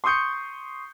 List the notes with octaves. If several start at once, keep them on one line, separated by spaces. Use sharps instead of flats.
C6 C#6 D#6 G6 C#7